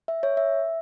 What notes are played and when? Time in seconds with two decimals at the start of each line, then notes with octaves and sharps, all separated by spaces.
0.08 E5
0.23 C#5
0.37 E5